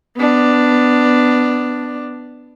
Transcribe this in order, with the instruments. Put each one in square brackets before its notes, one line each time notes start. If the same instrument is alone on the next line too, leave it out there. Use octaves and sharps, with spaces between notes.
[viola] B3 D4